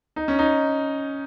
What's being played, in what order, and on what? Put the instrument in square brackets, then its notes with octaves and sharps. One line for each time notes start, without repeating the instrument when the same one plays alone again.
[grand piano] D#4
C#4
D#4